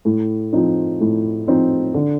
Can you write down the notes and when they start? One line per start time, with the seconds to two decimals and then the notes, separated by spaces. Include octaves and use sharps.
0.05 A2
0.53 F3 C4 D#4
1.01 A2
1.48 F3 C4 D#4
1.94 D3